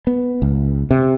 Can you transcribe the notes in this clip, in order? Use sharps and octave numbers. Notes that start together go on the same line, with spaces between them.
B3
C#2
C3